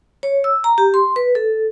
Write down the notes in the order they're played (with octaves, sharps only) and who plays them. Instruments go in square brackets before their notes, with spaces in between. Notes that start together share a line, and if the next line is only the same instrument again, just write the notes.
[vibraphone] C#5
E6
A#5
G4
C6
B4
A4